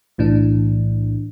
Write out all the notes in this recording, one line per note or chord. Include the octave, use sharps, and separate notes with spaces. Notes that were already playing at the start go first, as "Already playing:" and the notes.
B1 A2 E3 D4